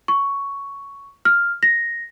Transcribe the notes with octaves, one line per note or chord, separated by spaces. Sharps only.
C#6
F6
A#6